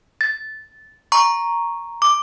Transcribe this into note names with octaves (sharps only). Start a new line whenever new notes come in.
A6
A#5 C#6
D6